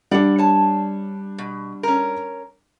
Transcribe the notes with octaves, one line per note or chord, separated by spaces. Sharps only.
G3 D4 D5 F#5
C#5 A5
B2
C#4 A#4